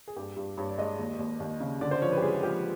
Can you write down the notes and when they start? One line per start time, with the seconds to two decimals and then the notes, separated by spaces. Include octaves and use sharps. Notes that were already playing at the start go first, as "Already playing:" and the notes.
0.08 G#4
0.16 G2 G4
0.36 G2
0.57 G2 C#5
0.68 D5
0.78 G#3 D#5
0.99 D#2
1.19 D#2
1.40 D#2
1.60 C#3
1.81 D3 D5
1.91 C5
2.02 F3 C#5
2.12 B4
2.18 G4
2.22 G#3 G#4
2.33 G#4
2.43 F3 G4